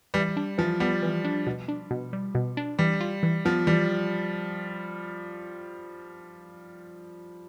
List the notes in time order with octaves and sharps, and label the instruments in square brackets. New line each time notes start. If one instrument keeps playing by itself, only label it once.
[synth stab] E3 [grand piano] G3
[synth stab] D4
[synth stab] E3 [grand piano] F3
[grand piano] G3 [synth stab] B3
[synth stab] E3
D4
B2
D4
B2
G3
B2
D4
[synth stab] E3 [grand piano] G3
[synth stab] F4
E3
[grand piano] F3 [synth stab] B3
[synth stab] E3 [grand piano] G3